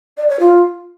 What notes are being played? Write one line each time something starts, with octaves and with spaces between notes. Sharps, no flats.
D5
C#5
F4